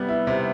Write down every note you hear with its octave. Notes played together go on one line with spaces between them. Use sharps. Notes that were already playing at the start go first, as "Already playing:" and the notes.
Already playing: C3 G3 B3
E4
C3